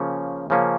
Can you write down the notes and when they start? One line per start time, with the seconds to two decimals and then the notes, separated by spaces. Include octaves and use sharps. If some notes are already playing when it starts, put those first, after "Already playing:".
Already playing: C#3 F3 A#3 C#4
0.50 C#3 F3 A#3 C#4